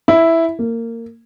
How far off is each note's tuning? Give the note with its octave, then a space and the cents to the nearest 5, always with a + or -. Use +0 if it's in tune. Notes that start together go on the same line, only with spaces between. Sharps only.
E4 +0
A#3 -20